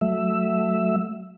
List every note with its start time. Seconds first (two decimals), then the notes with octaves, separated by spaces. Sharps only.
0.01 F#3 A3 E5